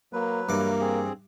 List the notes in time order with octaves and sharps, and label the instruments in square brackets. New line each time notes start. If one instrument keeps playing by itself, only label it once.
[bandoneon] F#3 B4 [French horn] A#3
[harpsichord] G2 E3 D6 [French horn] A#3
[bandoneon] C4 G#4